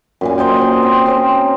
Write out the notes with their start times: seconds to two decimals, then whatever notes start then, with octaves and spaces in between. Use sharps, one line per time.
0.21 F#2 A#2 G#5
0.38 A#4 C5 D#5 G5
0.58 D#5 F#5 G#5
0.83 C4
1.06 C4 C#4 A#4 C5